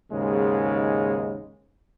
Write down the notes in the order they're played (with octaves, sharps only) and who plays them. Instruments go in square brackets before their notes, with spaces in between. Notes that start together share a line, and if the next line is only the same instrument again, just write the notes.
[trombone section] D#2 G#2 C#3 G#3